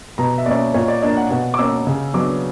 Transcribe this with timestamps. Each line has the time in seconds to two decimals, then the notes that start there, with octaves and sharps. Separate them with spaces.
0.18 B2 A#5
0.38 E5
0.46 A#3 C#4 D5
0.74 A#2 C#5
0.88 D5
1.02 A#3 D4
1.17 F#5
1.30 B2 F#5
1.54 D6
1.58 A#3 C#4 E6
1.87 C#3
2.14 F#3 B3 D4 D6